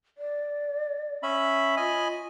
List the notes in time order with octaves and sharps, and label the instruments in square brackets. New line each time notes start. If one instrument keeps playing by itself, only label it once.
[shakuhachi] D5
[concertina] C#4 E5 B5
[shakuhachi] F4 [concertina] D#5 G#5 B5